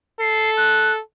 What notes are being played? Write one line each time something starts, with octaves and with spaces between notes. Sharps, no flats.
A4 C7
F#6